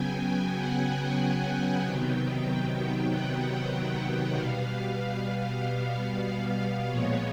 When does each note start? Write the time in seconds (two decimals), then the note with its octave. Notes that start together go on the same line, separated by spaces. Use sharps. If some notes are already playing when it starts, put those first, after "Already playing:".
Already playing: C#3 F#3 B3 G5 G#5
0.57 F#5
1.20 G5
1.84 C3 D#3 F#3 B3
2.46 G5
3.09 F#5
4.36 B2 G3 B3 F5
6.89 A#2 F3 G#3 B3 C#5